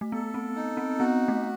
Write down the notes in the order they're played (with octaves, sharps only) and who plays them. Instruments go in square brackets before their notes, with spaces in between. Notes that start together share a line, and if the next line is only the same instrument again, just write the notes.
[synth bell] A3
[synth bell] B3 [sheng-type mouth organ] A4
[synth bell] C4
[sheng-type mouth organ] D#4
[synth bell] C4
[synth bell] B3 [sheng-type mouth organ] F#4
[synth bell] A3